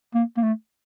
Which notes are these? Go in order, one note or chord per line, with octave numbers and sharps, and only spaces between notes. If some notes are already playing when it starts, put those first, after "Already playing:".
A#3
A#3
A3